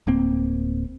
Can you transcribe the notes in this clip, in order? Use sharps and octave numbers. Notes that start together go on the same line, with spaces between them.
D1 A#3 C4